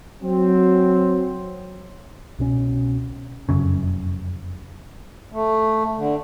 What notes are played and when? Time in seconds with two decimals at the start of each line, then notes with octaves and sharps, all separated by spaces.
0.21 F#3 C4
2.38 C2 B2 C#4
3.49 F1 A#1 F#2 C#3
5.32 A3
5.97 D3